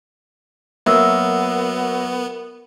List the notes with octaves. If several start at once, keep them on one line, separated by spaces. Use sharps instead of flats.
F#3 A#3 B3 F#4 A#4 E5 E6